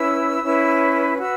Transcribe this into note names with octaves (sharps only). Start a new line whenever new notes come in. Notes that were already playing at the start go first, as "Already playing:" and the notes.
Already playing: C#4 E4 B4 E6
C#4 E4 B4
F#4 B4 E6